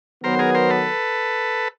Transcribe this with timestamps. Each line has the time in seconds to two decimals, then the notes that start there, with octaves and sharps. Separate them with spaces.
0.24 D#3 F#3 B3 A#4 C5
0.39 G#4 A#4
0.55 A#4 C5
0.70 A4 B4